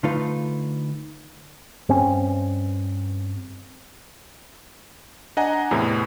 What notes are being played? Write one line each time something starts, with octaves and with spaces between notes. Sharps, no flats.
D3 A3 D#4 F4 B4 F5
G2 C4 C#4
D4 D#5 F#5 G#5 A#5
E2 A2 C3 E3